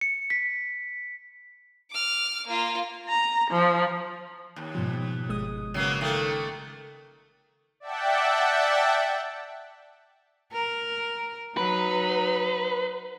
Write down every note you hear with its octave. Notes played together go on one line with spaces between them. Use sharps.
C#7
B6
D6 F6
A#3 F4
A#5
F3
D#2
G#2 B2 F3
G1 G#3 D#6
C#3 F#3 A#3 B3 C7 D#7
D#3 A3 A#3
D5 E5 F#5 G5 A5
A#4
F#3 D#4 B4